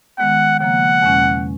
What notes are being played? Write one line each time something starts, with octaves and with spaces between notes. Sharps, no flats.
D#3 G#3 B3 F#5
C#3 F3 A#3 F#5
E2 B2 G#3 C#4